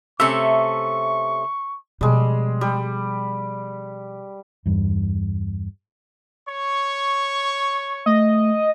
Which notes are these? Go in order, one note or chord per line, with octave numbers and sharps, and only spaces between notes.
C3 A3 C#4 E5 C#6
B2 F3 G3 G#3
G3
E2 G2
C#5 C#6
A3 D#5